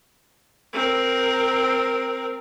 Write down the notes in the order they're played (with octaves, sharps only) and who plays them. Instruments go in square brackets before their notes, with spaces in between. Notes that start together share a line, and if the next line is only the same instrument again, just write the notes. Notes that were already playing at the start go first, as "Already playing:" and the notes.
[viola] C4 A#4